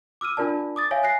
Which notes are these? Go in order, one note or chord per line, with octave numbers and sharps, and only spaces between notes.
D6 E6 F6 D#7
D4 F4 A#4 D5 A5
D6 D#6 A6
C#5 E5 F5 G#5
G#5 F#6 A#6 C7